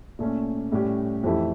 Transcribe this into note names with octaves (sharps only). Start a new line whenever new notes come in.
A#2 A3 C#4
A2 G3 C#4 G4
F2 E3 A3 E4 G4